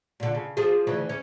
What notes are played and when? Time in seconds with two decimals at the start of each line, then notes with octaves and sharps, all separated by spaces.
0.20 A#2 D3
0.35 C#3
0.57 F3 F4 G#4
0.87 D2 C#3 E3
1.09 C#4